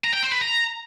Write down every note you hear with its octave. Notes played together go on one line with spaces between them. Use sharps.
A#5
G5
C5
B4
A#5